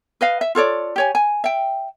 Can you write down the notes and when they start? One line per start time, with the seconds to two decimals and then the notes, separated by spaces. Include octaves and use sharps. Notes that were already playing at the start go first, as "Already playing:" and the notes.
0.21 B4 D#5 F5
0.41 E5
0.55 F4 A4 C#5 D5
0.96 G4 C#5 G#5
1.15 G#5
1.44 E5 G5